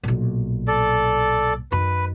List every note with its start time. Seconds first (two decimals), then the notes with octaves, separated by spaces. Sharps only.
0.03 B1 A#2
0.68 A4 D5
1.72 F#2 D#3 B4